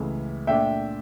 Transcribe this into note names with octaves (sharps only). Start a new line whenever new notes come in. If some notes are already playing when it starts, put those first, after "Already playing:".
Already playing: C#2 C#3 E3 A3
A#2 A3 D4 E5 G5